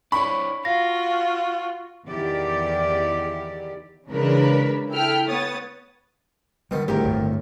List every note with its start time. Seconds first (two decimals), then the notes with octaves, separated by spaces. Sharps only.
0.12 D4 E4 C#5 B5 C#6
0.65 F4 F#4 F5 A#6
2.07 E2 D#3 E4 G4 D5
4.09 C#3 E3 G#3 D4 A#4 B4
4.93 E4 A4 G5 F6 B6
5.29 B3 C#5 D#6 A6
6.71 B2 D3 D#3 G3
6.88 G#1 D2 A2 G4 A#4
7.05 G1 F2